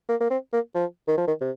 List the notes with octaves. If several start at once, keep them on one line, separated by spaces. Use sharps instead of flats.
A#3
A#3
C4
A#3
F3
D#3
F3
D#3
C3